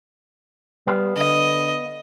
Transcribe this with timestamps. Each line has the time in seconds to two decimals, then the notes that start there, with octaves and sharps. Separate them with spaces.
0.87 G3 B3 B4 F5
1.17 D3 D#5